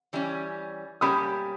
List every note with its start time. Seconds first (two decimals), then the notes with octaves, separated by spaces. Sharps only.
0.13 E3 G3 C#4
1.01 G3 A#3 C#4 G4 B5 D#6